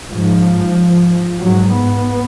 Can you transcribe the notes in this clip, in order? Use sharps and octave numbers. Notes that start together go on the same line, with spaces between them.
G#2 F3
G#2 F#3
B3